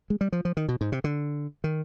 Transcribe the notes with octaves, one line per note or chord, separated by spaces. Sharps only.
G#3
G3
F3
F3
D#3
B2
G#2
C3
D3
D#3